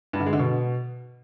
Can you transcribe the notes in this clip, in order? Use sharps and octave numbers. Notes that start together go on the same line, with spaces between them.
G2
D3
G#3
D3
B2